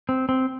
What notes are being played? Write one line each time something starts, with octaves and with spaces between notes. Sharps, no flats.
C4
C4